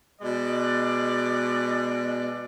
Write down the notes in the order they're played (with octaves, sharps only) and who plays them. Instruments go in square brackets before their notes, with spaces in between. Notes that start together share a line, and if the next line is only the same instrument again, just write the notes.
[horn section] B2 G#3 D5